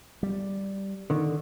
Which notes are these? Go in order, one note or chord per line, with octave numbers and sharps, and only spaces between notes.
G3
D3 D#3